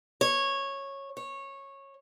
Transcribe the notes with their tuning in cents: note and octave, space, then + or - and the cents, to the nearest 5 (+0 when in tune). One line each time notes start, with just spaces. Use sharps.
C#5 -10
C#5 -15